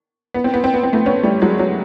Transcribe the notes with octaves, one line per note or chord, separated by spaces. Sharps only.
B3
C4
B3
C4
B3
C4
A3 B3
B3 C#4
G3 A3
F#3 G#3
F#3